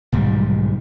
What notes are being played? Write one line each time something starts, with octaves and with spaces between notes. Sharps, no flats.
B1 G#2 D#3 G3